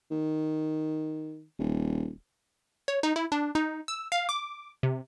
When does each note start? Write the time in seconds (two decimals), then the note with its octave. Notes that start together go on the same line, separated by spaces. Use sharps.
0.11 D#3
1.59 D#1
2.88 C#5
3.03 D#4
3.16 E4
3.32 D4
3.55 D#4
3.88 E6
4.12 F5
4.29 D6
4.83 C3